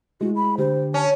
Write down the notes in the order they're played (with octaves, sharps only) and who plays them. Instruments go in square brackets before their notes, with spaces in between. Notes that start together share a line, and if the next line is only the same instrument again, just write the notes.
[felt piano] G#3 E4 [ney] F#4
[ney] B5
[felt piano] D3 G4 [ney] C5
[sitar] C#4 [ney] A5